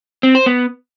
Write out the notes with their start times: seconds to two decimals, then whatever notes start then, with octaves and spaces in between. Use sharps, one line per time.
0.23 C4
0.35 C5
0.46 B3